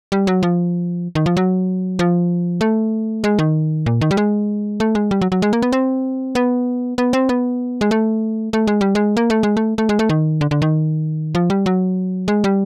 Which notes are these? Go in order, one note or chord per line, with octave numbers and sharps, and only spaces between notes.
G3
F#3
F3
D#3
F3
F#3
F3
A3
G#3
D#3
A#2
D#3
G3
G#3
A3
G#3
G3
F#3
F#3
G#3
A#3
B3
C4
B3
B3
C4
B3
G#3
A3
A3
G#3
G3
G#3
A#3
A3
G#3
A3
A3
G#3
A3
D#3
D3
D3
D#3
F3
G3
F#3
G#3
G3